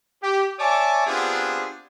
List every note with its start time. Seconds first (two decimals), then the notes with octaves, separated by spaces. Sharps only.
0.23 G4
0.60 C#5 D5 E5 G#5 A5 D6
1.07 B3 C4 D4 F4 G4 G#4